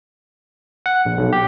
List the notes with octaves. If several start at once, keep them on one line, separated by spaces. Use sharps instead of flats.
F#5
A#1
B1
G4